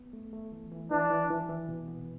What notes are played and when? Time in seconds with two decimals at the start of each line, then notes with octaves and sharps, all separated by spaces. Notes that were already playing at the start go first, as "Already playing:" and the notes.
Already playing: B3
0.13 A3
0.33 A3
0.52 E3
0.72 E3
0.91 E3 D4
1.11 E3
1.30 E3
1.49 E3
1.69 B2
1.88 B3